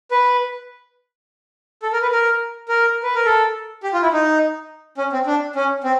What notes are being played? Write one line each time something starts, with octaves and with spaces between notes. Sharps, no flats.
B4
A4
A#4
B4
A#4
A#4
B4
A#4
A4
G4
F4
E4
D#4
C#4
C4
D4
C#4
C4